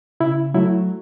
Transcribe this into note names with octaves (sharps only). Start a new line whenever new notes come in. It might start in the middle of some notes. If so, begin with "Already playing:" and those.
C#3 E4
F#3 A3 E4